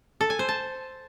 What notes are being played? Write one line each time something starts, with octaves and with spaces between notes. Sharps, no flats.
A4
G#5
C5
A5